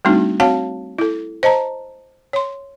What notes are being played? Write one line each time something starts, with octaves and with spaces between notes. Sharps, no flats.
G3 A3 C4 D4 D#4 F#4
C4 F#4 C#5 F5 F#5 A5
E4 A4
C5 D#5 A5 A#5
C#5 C6